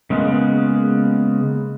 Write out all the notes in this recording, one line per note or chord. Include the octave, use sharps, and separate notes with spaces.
C#3 G#3 A#3 B3